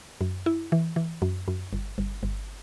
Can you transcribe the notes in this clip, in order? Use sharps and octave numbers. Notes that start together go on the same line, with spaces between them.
F#2
E4
E3
E3
F#2
F#2
G1
G1
G1